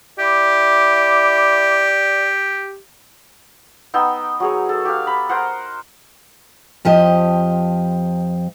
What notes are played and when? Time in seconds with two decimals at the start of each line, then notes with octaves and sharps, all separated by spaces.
0.19 E4 G4 D5 B5 D6
3.94 B3 D#4 G5 E6
4.40 F#3 G#4 C#5
4.69 A4
4.85 G4 F5
5.07 B5
5.29 A#4 C5 F#5
6.85 F2 F3 G4 D#5